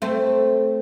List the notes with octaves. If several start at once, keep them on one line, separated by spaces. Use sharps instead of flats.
A3 C4